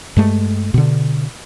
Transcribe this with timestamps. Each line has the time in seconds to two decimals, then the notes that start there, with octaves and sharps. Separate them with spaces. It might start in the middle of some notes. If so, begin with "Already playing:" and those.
0.17 G2 G#3 A3
0.74 B2 D3